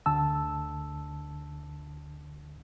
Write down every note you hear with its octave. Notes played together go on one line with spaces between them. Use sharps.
D2 D3 A5 E6